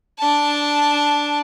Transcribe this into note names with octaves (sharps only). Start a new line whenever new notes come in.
D4 A5